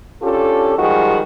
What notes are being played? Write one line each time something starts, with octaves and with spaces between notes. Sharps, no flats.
C#4 D4 F4 G4 A4
D#3 F3 G3 G#3 F#4 G#4